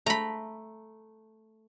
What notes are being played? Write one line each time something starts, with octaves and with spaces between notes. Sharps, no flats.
A3 A#5 B5